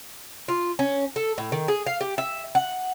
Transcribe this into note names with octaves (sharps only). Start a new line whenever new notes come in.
F4
C#4
A4
A2
D#3
G#4
F5
G4
E5
F#5